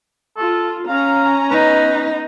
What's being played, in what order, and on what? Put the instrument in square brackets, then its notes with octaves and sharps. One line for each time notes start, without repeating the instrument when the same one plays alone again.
[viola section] F4 [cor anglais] A4
[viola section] C#4 A#5 [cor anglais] F5
[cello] B3 D#4 [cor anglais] B4